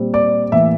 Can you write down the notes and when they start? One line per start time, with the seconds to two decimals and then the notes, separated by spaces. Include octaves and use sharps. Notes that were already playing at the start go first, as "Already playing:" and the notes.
Already playing: A#2 G3 C4
0.14 D5
0.52 A2 E3 A#3 E5